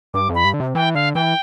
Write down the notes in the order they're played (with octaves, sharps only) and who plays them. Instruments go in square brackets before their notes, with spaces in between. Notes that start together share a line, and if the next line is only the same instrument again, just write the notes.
[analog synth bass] G2 [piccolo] D6
[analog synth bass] F2
[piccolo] B5
[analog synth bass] G2
D3
C3
[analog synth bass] E3 [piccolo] G5
[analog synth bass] D3 [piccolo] F5
[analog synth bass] E3 [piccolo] G5